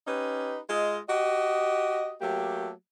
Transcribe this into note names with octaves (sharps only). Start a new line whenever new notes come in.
C#4 D#4 G4 B4
G#3 F4 D#5
F#4 G4 D#5
F#3 A3 A#3 G4